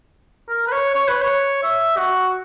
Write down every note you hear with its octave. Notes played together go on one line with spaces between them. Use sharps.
A#4
B4
C#5
C#5
B4
C#5
E5
F#4